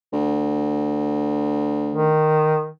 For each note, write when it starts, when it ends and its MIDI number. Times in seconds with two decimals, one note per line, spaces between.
0.13 2.14 38
1.94 2.69 51